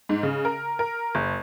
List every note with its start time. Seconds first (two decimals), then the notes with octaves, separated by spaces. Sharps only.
0.09 G#2
0.23 C#3
0.45 A#4
0.79 A#4
1.15 F#1